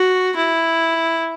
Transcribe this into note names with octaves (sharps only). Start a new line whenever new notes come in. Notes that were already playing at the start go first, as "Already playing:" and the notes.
Already playing: F#4
E4